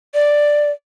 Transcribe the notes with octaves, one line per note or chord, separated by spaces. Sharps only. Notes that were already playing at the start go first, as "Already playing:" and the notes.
D5